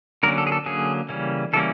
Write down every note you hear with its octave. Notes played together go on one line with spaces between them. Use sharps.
D3 F#3 A#3 C#4 A#4
A4
G#4
A4
D3 F#3 A#3 C#4 G#4
C#3 E3 G3 A#3 C#4
C#3 E3 G3 A#3 C#4 A4